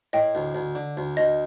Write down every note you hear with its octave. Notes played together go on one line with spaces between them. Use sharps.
A2 D#5 G5
D2
D2
D3
D2
D2 D#5